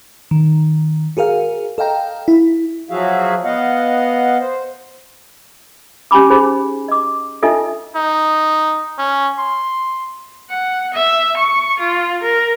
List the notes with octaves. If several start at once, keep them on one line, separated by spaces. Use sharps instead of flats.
D#3
F#4 G#4 A#4 F5
A4 D#5 F5 G5 A#5
E4
F3 F#3 F#4 G#4 E5 F5
B3 D#5 F5 F#5
C5
C#4 G4 G#5 B5 D6
D#4 G#4 C5 B5
D#5 D6
D4 D#4 F4 A4 D#5 E5
D#4
C#4
C6
F#5
E5
C#6
F4
A#4